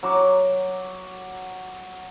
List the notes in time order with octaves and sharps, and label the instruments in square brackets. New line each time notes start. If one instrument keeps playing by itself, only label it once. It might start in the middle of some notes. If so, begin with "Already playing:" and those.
[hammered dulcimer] F#3 D6